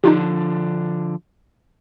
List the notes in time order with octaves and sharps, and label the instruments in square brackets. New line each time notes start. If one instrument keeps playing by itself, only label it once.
[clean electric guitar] D3 F3 D4 [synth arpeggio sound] D#4 F4 G4